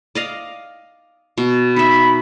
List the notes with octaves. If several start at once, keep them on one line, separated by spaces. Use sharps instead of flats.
D5 D#5 F5
B2
D#4 E5 B5